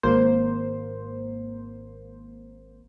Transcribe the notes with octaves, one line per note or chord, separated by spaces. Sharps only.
G#1 A#3 C5